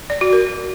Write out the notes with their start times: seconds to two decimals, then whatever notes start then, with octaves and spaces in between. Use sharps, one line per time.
0.10 D5
0.21 F#4
0.33 A#4